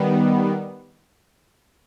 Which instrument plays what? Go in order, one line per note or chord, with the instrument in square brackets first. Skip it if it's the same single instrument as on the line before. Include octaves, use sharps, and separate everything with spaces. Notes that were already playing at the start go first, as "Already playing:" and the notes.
Already playing: [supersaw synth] D#3 G3 B3